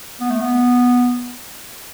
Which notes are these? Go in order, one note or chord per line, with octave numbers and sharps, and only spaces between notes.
B3
A3
B3